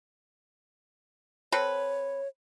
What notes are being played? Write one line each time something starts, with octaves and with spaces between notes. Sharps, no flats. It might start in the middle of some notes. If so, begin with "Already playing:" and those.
C4 A4 B4 C#5